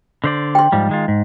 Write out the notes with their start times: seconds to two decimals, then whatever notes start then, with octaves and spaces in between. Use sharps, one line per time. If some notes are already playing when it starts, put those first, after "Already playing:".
0.24 D3 C5 D5
0.55 G5 C6
0.72 G#2 F3 G3
0.89 D#3 G#3 F4
1.08 G#2